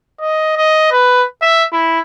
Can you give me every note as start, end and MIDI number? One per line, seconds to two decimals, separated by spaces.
0.21 0.57 75
0.57 0.88 75
0.92 1.26 71
1.42 1.64 76
1.73 2.00 64